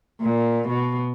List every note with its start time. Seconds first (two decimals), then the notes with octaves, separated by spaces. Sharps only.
0.22 A#2
0.69 B2